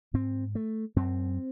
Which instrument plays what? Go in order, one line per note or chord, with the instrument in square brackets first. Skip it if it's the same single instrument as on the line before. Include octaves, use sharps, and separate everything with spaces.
[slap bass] G#2 C4
A3
F#2 C4